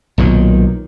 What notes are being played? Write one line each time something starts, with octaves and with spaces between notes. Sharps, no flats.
B1 A#2 D#3